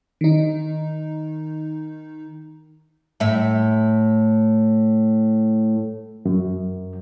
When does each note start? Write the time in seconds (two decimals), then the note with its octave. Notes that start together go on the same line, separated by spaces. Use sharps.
0.21 D#3 D#4
3.20 A2 E5
6.25 F#2